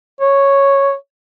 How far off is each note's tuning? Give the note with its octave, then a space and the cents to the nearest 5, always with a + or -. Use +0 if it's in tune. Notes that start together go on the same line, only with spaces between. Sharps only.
C#5 -5